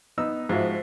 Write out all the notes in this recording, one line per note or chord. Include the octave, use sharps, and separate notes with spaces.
B3 D#4 E6
G#2 F3 F4 F#4 E5